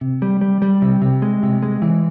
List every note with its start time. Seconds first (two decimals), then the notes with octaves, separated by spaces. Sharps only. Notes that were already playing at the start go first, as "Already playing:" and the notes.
0.01 C3
0.22 G3
0.41 G3
0.62 G3
0.82 C3
1.02 C3
1.22 G#3
1.43 C3
1.63 G#3
1.82 E3